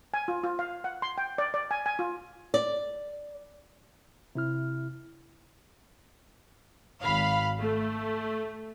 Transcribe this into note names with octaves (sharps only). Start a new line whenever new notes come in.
G#5
F4
F4
F5
F#5
C6
G5
D5
D5
G#5
G#5
F4
D5
C3 E4 F6
G#1 F5 B5
A3